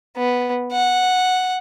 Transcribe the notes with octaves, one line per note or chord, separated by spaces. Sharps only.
B3
F#5